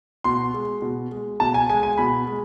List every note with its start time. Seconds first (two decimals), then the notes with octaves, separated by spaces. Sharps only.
0.24 B2 C6
0.54 G#3
0.82 B2
1.11 G#3
1.40 B2 A5
1.54 G#5
1.69 G#3 G#5
1.83 G#5
1.98 B2 B5
2.27 G#3